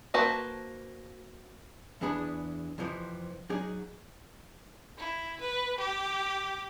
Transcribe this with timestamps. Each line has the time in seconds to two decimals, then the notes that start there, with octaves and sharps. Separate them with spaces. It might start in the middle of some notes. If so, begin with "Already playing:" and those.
0.14 A#3 F#4 B4 C5 A5
2.01 E2 E3 B3 D4 G#4 B5
2.78 F2 C3 E3 F3
3.50 F#3 D#4 G#4 D5
4.98 E4
5.41 B4
5.78 G4